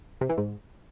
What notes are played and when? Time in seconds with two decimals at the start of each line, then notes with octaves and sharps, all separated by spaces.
0.21 C3
0.29 E3
0.38 G#2